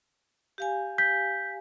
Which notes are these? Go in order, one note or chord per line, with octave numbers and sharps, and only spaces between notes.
G4 F5 G#5
G6 B6